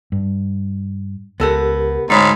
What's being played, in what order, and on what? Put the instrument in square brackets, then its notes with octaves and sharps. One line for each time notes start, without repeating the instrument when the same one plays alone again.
[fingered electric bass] G2
[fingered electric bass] C#2 [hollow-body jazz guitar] B3 A4 F#5 [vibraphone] G4 A#4
[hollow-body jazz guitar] D2 C#5 B5 [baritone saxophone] G#2 [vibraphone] G#3